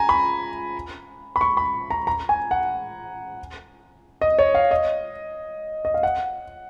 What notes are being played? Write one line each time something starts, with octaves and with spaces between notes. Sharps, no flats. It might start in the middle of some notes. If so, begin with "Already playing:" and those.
Already playing: G#5 A#5
B5
B5
C#6
B5
A#5
A#5
G#5
F#5
D#5
C#5
F5
D#5
D#5
F5
F#5